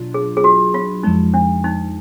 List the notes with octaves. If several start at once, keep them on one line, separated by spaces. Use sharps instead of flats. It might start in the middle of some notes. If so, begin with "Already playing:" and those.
Already playing: B2 F#3 D4 F4
G#4
G#4
F#4
F4
F2 F3 G#3 D#4
D4
D#4